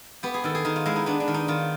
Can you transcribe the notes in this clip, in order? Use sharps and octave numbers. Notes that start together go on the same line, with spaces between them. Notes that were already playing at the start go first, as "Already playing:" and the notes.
B3 G4
G#4
D#3 A4
G#4
D#3 D#4
F4
G#3 E4
D#4
B3 D4
D4
D#3
D#4
D#3 F4